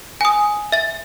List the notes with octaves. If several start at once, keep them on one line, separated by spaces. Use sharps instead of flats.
G#5 D#6
E5 A6